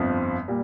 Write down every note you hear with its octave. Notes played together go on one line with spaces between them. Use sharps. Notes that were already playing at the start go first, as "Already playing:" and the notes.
Already playing: G1 F2 F3 C4
A#2 G3